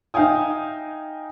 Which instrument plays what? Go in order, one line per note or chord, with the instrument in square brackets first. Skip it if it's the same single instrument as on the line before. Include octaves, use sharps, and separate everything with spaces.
[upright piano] D#4 E5 F5 G5 G#5 D#6